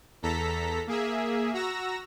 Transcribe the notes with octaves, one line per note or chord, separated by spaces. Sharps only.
E2 A4 A#5 B6
A#3 G#4 E5
F#4 A#5 E6 A#6